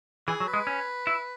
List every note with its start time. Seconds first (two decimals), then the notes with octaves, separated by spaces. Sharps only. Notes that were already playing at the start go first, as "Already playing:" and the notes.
0.28 E3 G#4
0.40 F#3
0.48 B4
0.54 G#3
0.67 C#4
1.07 E4